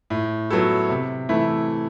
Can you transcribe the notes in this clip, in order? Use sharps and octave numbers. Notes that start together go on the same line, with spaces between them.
A2
F#3 B3 E4 A4
C3
E3 A3 E4